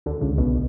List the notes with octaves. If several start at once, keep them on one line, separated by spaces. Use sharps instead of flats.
D2 D3
C#2 C#3
B1 B2